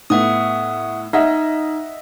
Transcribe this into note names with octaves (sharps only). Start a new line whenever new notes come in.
A2 B3 E5 F#5 D#6
D#4 D#5 E5 F#5